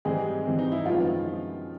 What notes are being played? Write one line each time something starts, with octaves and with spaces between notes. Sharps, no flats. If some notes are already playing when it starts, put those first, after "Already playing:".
G#2 E3 G3 G#3 C4 G#4
G#2 E3 G3 C4
D#4
E4
F#2 D#3 F3 G#3 B3 F4